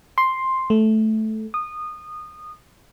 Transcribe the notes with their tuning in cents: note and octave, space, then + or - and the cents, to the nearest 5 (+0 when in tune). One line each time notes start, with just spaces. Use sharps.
C6 +5
A3 -10
D#6 -20